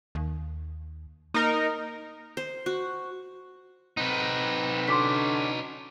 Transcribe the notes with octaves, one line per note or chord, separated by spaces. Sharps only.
D#2
A#3 D#4 A#4
C5
F#4
C4 D#4 B4 F#5 A#5
D3 C#4 D4 F#4 C6 D6 B6